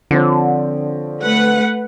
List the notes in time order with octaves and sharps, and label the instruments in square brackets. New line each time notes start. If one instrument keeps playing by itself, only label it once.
[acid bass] D3 [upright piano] F3 C4 C#5
[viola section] A3 B4 F#5